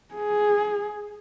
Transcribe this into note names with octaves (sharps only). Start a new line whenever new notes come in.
G#4